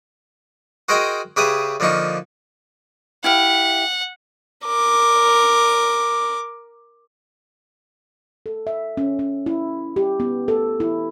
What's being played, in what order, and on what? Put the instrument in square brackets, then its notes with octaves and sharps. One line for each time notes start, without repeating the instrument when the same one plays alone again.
[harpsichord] F#4 G#4 A#4 C5 D#5 G5
C#3 G4 G#4 B4 E5 D#6
D3 F3 A#3 D#4 C#6
[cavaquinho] E4 G4 F5 [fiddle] F#5
[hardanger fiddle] A#4 D6
[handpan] A4
E5
C#4
C#4
E4
G4
B3
A4
E4